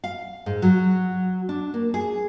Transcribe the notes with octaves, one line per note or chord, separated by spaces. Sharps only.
F5
G#2
F#3
D4
A#3
G#4